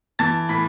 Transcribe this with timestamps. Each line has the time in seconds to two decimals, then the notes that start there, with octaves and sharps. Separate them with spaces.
0.19 E3 A5 A6
0.48 A2 B5 B6